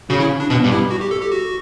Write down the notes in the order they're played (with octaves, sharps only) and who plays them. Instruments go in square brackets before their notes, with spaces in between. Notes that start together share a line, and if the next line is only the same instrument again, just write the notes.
[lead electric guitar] C#3 [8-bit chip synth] F#4
[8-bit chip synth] E4
D4
[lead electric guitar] B2 [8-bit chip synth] D4
[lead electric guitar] G2
[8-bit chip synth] E4
F#4
G4
A4
G4
F#4